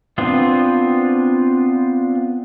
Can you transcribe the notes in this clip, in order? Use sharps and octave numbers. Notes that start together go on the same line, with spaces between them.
B3 C4 D4 F4